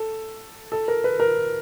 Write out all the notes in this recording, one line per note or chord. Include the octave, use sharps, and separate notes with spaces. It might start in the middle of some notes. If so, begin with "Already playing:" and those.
Already playing: A4
A4
A#4
B4
A#4